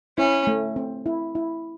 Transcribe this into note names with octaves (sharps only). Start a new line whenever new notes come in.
C#4 E4
A3
C4
E4
E4